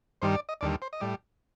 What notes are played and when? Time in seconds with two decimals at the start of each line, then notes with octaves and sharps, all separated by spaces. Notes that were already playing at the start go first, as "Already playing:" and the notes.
0.22 G2 D#3 G3 C5
0.35 D5
0.49 D#5
0.61 D#2 D3 G3 D5
0.82 C5
0.93 D#5
1.00 A2 G3 D5